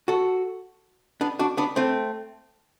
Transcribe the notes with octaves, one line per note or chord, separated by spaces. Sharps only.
F#4 A4
B3 D4
D4 F#4
B3 D4
A3 C4